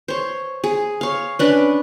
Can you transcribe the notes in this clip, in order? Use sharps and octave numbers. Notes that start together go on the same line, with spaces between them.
C5 C#5
G#4
C#5 F5
C#4 D4 B4